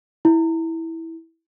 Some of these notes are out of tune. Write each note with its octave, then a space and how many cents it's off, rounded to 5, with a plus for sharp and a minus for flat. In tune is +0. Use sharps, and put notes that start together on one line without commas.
E4 -10